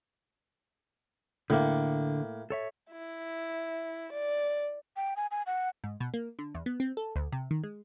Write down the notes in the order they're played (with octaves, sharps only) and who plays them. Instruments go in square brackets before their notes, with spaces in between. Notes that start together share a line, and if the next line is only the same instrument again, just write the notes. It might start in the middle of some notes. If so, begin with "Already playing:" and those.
[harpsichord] A2 A#3 [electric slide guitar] D3
[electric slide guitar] A4 C#5 E5
[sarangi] E4
D5
[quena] G5
G#5
G#5
F#5
[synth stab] G#2
B2
A#3
D3
E2
B3
C4
A4
D2
C3
D#3
G#3